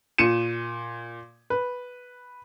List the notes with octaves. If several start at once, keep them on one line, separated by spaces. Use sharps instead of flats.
A#2 C#7 D#7 E7
B4